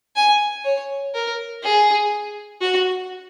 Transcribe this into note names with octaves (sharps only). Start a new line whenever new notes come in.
G#5
C#5
A#4
G#4
F#4